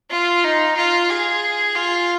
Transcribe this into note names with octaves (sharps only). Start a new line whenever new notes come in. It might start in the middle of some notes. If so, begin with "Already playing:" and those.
F4
D#4
F4
G#4
F4